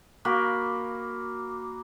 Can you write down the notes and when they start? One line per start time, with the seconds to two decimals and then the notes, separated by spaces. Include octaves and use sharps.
0.25 A#3 F#4 B5